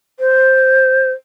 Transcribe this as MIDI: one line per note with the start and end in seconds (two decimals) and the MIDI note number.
0.20 1.11 72